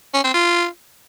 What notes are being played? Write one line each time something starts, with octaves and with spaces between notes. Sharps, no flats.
C#4
C4
F4